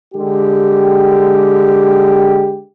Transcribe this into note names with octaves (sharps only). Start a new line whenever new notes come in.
D3 G#3 G4